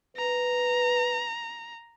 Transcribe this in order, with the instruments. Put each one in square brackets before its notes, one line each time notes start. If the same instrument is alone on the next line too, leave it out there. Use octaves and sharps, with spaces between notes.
[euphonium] B4 [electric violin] A#5